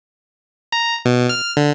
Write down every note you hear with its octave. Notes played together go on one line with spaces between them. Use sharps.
A#5
B2
F6
D3